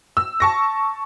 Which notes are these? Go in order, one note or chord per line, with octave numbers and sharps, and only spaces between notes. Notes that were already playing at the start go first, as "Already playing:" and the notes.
E6
A5 C#6 A#6